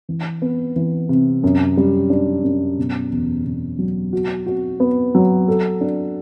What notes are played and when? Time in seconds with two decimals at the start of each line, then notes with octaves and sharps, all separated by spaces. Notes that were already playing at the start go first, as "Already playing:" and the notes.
0.09 E3
0.42 B3
0.76 E3
1.09 C3
1.44 F#2
1.77 G3
2.10 D4
2.44 F#2
2.78 B2
3.12 E2
3.46 B2
3.79 F#3
4.13 F#4
4.46 F#4
4.80 B3
5.15 F#3
5.48 A4
5.81 D4